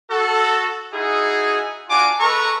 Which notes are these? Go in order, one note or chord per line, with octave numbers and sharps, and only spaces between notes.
F#4 A4
D#4 E4 F#4 G#4
D4 F4 F#4 G#5 D6
G#3 A4 B4 A#5 C#6